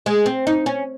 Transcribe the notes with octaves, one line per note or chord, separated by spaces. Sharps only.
G#3
C4
D#4
C#4